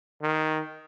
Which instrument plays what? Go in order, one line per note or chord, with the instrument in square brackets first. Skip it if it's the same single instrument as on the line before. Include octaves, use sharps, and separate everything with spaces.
[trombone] D#3